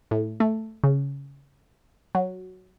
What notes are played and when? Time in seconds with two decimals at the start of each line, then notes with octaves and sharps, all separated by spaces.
0.11 A2
0.40 A3
0.84 C#3
2.15 F#3